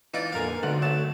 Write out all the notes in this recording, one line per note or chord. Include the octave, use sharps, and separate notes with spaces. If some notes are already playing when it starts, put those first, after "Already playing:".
E3 D#4 F4 D5
F2 A#2 D3 B3 A#4 F5 G#5
B1 D3 A3 C4 D#4 D5 F#5
F#3 A3 A5